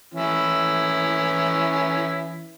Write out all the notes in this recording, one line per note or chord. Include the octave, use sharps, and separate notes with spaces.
E3 C#4 E4